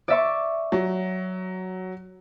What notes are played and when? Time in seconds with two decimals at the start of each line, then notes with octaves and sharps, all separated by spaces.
0.08 D5 E5 C#6
0.72 F#3